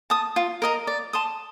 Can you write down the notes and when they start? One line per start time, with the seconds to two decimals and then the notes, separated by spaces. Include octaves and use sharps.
0.10 A5 D#6
0.36 F4
0.62 A#4 D#5 A#5
0.87 D5
1.13 A5 C6 D#6